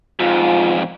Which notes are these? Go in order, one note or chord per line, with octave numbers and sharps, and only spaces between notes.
F2 G#2 F4